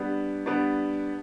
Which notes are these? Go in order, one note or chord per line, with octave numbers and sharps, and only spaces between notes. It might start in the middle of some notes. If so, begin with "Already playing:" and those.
Already playing: G3 B3 D4
G3 B3 D4